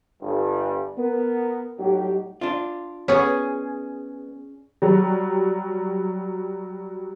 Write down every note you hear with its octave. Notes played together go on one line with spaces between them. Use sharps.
G1 G2
B3 A#4
A2 F#3 G3 D#4 F#4 G4
D4 F4
B3 C#4 G#4 C#5
F#3 G3